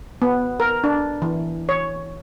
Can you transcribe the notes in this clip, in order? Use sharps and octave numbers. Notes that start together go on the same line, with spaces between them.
B3
A#4
D4
E3
C#5